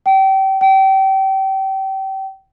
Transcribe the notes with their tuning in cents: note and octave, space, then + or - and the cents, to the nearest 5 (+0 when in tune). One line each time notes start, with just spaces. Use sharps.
G5 -30
G5 -30